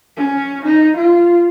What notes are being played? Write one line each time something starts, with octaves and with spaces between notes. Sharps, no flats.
C#4
D#4
F4